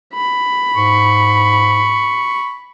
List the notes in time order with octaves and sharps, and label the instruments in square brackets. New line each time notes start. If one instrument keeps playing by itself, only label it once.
[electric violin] B5
[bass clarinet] G#2 [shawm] C#6